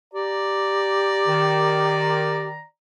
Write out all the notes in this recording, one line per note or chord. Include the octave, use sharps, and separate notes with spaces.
G4 D5 A#5
D#3